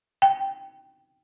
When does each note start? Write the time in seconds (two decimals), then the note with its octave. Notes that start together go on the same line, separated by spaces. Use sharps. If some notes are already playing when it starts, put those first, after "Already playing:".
0.22 G5